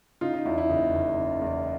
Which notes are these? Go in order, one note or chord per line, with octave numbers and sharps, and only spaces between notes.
C#3 D#4 F4
D#4
E2 E4
E4
F#1 D#4
F#1
C#3
E2